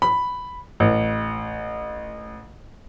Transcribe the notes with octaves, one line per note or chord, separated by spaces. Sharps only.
B5
A1